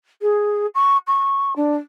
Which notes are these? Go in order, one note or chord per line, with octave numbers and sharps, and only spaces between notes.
G#4
C#6
C#6
D4